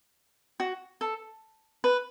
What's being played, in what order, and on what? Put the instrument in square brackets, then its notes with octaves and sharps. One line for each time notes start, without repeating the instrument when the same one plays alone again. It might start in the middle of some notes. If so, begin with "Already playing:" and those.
[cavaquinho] F#4
A4
B4